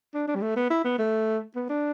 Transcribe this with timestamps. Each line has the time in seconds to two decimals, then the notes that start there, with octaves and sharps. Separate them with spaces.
0.14 D4
0.28 D4
0.35 G3
0.42 A3
0.57 B3
0.70 E4
0.85 B3
0.99 A3
1.55 B3
1.70 D4